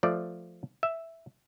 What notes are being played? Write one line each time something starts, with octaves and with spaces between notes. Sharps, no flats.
F3 A3 D5
E5